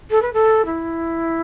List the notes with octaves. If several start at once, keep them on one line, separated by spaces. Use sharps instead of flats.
A4
B4
A4
E4